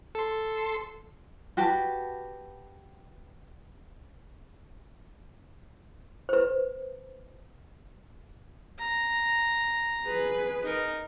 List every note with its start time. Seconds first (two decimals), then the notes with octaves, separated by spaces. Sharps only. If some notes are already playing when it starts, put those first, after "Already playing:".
0.15 A4 C6
1.57 F#4 G4 B4 A5
6.29 B4 C5
8.78 A#5
10.04 G#4 B4
10.63 D#4 A#4